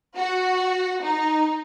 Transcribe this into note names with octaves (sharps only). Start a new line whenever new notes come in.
F#4
D#4